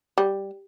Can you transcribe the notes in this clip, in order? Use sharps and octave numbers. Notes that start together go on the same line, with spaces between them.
G3